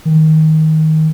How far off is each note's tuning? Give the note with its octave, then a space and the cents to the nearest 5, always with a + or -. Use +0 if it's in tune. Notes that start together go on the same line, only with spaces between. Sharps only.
D#3 +15